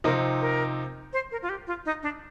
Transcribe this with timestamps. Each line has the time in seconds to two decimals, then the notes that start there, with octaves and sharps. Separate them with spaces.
0.04 C3 F3 C4 D#4 A#4
0.41 A#4
1.13 C5
1.31 A#4
1.42 F4
1.49 G4
1.67 F4
1.86 D#4
2.03 D4